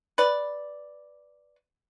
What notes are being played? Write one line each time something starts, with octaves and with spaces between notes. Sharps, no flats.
B4 D5